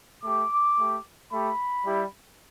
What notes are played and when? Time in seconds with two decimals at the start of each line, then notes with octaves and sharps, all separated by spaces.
0.24 A3 G4 D6
0.77 A3 G4
1.31 A3 G4 B5
1.85 G3 E4 G4